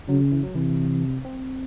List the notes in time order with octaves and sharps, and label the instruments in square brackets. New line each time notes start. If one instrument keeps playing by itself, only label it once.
[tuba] C#3 [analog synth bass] F#3
[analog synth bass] E3
F#3
[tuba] C3 [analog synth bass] E3
[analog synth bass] C4